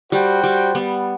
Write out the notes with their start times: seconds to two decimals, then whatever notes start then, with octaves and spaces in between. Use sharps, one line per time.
0.12 G3 F#4 C5 G5
0.44 G3
0.75 G3 B3